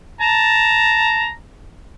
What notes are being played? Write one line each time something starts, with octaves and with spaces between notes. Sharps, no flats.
A5 A#5